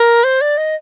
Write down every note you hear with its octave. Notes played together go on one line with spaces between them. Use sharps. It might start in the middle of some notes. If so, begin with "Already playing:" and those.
Already playing: A#4
C5
D5
D#5